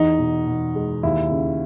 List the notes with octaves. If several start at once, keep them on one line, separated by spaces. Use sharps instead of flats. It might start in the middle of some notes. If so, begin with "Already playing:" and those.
Already playing: E2 D#4
B2
B2
G#3
D#2 E4
C#3